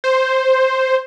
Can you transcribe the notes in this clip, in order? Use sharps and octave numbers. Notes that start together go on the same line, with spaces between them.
C5